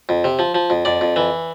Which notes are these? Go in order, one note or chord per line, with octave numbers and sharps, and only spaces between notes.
F2
C3
F3
F3
F2
F2 D5
F2
E3